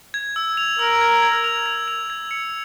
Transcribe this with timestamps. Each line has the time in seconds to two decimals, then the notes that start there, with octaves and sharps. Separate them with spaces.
0.14 G#6
0.36 E6
0.57 F7
0.79 A#4 E6
1.01 G#6
1.22 G#6
1.44 F7
1.66 G#6
1.88 F7
2.10 G#6
2.31 C#7